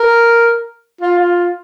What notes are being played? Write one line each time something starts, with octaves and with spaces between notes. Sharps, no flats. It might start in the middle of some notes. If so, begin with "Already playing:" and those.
Already playing: A#4
F4
F4